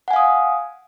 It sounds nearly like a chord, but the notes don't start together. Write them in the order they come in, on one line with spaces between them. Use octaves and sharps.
F#5 G#5 F5 D#6